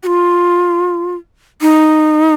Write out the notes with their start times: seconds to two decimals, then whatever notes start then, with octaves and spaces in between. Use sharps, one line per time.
0.03 F#4
0.07 F4
1.61 D#4